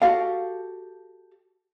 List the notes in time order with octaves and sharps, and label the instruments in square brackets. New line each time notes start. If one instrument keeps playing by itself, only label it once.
[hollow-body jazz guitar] F#4 G4 A4 F5